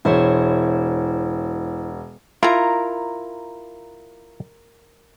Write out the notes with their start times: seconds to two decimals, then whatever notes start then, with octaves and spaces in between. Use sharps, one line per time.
0.05 E1 E4 C5 C#5
2.43 E4 F4 A#4 A#5